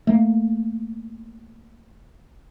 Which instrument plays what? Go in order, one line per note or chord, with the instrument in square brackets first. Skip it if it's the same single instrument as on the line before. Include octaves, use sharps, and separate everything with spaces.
[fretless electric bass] A3 A#3